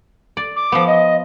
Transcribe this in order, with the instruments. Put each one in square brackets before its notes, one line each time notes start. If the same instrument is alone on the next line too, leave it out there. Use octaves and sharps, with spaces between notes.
[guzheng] D5
[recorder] D6
[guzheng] F3 B3
[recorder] D#5